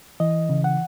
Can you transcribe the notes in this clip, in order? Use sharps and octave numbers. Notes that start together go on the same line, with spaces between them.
E3 D#5
C#3
F#5